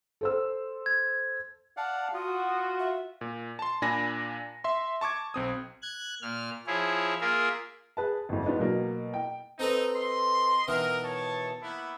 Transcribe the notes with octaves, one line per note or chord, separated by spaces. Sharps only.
A4 C5 E6
G#6
D5 F5 F#5 A5
F4 F#4 D#6
E5
A#2
A5 C6
A#2 D4 G#5 B5 A#6
E5 C6
A5 C#6 D6 G#6
B1 C4 D#6
F#6 G#6
A#2 F6
F3 E4 G#4 C#5
A#3 F4 G#4 A#4 E5
G#4 B4 A5
G1 F2
A1 G#2 B3 D4 F4
B2 F#3 A#3
G5
C4 D#4 A4 B4
D#5 C6
B2 D#3 E3 A#4
C#5 A5
A#3 B3 E4